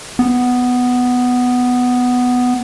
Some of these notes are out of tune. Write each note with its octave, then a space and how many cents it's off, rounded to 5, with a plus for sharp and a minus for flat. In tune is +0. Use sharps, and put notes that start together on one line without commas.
B3 +5